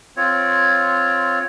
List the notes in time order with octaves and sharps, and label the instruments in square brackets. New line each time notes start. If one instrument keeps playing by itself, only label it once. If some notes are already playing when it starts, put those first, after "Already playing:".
[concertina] C4 F4 C#5